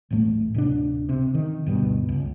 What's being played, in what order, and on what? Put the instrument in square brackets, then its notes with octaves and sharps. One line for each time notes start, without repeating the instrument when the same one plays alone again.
[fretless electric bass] D#1 A1 A2 A3
D1 C3 D4
C3
D#3
D2 G2 B2
C#2